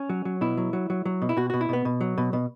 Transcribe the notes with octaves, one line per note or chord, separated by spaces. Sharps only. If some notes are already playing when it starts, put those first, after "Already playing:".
Already playing: C#4
F#3
F#3
B2 E4
F#3
F#3
F#3
F#3
B2
E4
B2 F#4
B2 F#4
E4
B2 B3
B2
F#3
B2
B2